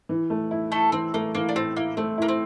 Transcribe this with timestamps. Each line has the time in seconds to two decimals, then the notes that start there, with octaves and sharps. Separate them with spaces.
0.09 E3
0.30 A3
0.51 E4
0.72 A3 E4 A4
0.92 E3 C4
1.14 A3 A#3
1.35 E3 A#3
1.49 D4
1.55 A2 C4
1.76 A#3 E4
1.97 A3 C4
2.18 A#3 E4
2.28 C4